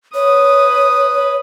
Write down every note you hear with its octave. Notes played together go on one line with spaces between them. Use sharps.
B4 C#5 D#6